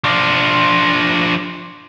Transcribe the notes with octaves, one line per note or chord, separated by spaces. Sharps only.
F3 D4